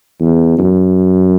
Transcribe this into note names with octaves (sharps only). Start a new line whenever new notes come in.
E2
F#2